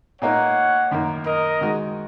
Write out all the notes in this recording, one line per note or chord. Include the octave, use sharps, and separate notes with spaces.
A#2 A#3 D#4 C#5 F#5
F#2 D#3 A#3
A#4 D#5
D#3 G#3 F#4